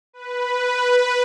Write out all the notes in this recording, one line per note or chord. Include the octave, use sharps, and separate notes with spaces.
B4